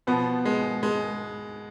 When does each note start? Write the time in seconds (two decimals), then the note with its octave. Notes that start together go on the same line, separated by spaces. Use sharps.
0.07 B2 F3 B3
0.45 G#3
0.83 G#3